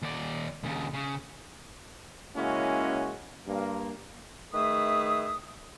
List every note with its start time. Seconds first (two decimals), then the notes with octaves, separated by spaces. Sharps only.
0.02 D#2 D5
0.63 D#2 C#3
0.93 C#3
2.36 C#3 G#3 A#3 C#4 E4 F#4
3.47 G2 A#3
4.53 D#3 A3 G#4 B4 E5 D#6